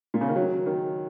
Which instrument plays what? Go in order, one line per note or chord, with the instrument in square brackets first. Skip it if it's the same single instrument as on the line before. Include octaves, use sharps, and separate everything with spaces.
[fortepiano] A#2
C#3
D#3
F#3
D#3